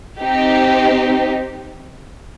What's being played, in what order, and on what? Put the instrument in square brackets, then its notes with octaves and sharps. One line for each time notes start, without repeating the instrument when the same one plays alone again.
[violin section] C4 D#4 G4